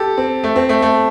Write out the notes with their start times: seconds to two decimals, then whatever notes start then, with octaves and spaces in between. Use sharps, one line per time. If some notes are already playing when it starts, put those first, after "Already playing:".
Already playing: G4 A4
0.17 C4
0.44 A3
0.56 C4
0.69 A3
0.82 A3